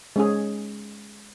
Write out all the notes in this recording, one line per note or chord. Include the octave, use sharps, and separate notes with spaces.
G#3 C#4 G#4